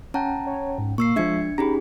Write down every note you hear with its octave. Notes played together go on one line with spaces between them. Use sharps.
C#4 F#5 G5 A5 A#5
C#5
G#2
A#2 A#3 C#6 E6 C7
F3 G#3 D4 E5 G#6 C#7
C#4 D#4 G4 G#4 A#5 B5